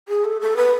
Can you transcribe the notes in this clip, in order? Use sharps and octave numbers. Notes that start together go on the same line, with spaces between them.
G#4
A4
A4
B4